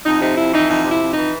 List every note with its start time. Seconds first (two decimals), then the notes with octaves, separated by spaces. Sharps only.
0.06 F2 D#4
0.22 C3 D#4
0.38 F2 E4
0.53 E3 D#4
0.70 F2 D#4
0.86 C3
0.91 E4
1.01 F2
1.12 D#4
1.17 E3